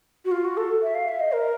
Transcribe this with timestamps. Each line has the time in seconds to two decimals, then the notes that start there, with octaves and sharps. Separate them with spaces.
0.25 F#4
0.31 F4
0.45 F#4
0.57 A4
0.82 E5
0.95 F5
1.09 E5
1.20 D#5
1.34 A#4